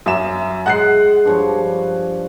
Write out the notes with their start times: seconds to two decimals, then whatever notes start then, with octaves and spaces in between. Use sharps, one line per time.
0.06 F#2 E5 D6 E7
0.66 G#3 F#5 F#6 C7
1.25 G2 F3 C#5